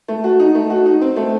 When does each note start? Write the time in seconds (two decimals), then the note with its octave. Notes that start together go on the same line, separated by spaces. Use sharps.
0.08 A3
0.24 F#4
0.39 D#4
0.55 A3
0.70 F#4
0.86 D#4
1.01 C4
1.16 A3